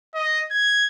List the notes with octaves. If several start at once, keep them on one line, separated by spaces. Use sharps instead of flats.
D#5
G#6